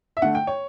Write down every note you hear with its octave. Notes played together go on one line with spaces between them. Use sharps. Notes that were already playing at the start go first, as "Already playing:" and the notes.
E5
D3 A3 F#5
G5
C#5